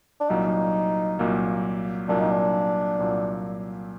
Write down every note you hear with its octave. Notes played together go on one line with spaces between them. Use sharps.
D4
C2 A#2 F#3 A#3 D#4
C2 A#2 F#3 A#3
C2 A#2 F#3 A#3 D4
D#4
D4
C2 A#2 F#3 A#3